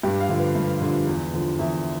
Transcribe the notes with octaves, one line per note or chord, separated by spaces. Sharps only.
G2 G4
F5
D3 F3
B4
G2
D3 F3
E2
D3 F3
E2 E5